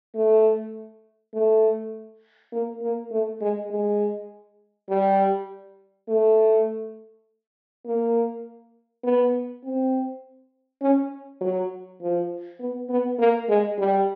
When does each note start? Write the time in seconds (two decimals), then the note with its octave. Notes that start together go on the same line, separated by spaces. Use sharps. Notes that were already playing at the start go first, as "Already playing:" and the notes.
0.15 A3
1.33 A3
2.52 A#3
2.82 A#3
3.11 A3
3.41 G#3
3.71 G#3
4.89 G3
6.08 A3
7.86 A#3
9.04 B3
9.64 C4
10.82 C#4
11.41 F#3
12.01 F3
12.60 B3
12.89 B3
13.19 A#3
13.49 G#3
13.79 G3